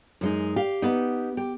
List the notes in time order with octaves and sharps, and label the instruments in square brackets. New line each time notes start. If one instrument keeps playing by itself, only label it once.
[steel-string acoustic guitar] F#2 G#3 D#4
[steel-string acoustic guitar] G4 [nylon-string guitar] F5
[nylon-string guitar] B3 D#4
G4